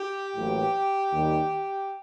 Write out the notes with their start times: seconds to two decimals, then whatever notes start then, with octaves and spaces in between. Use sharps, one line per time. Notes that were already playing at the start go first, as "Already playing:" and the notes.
Already playing: G4
0.35 A1 A2 F#3 A#3
1.11 D#2 D#3 G3